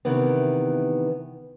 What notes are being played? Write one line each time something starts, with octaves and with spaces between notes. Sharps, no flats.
C3 D#3 E3 B3